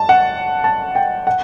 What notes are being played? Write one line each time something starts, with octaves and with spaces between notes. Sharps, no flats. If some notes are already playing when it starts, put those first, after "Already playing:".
Already playing: A5
F#5
A5
G5
F#5